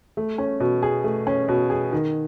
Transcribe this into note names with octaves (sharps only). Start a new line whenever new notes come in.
A3
C#4
B2
G#4
A3
C#4
B2
G#4
D#3